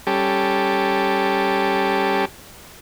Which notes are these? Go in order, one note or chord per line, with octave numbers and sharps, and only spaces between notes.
G3 C#4 G4 A4